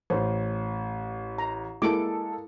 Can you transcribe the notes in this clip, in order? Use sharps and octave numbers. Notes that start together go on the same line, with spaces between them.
A1 C5
A#5
G#3 A#3 E4 A4 D6